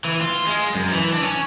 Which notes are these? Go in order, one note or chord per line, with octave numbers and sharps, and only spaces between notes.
E3
F4
G#3
F#2
E3
D4
C#4